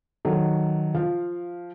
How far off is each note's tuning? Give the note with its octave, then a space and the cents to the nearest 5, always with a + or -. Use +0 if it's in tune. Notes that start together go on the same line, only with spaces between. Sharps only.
D#3 +0 F#3 +0 A4 +0
F3 +0 F5 +0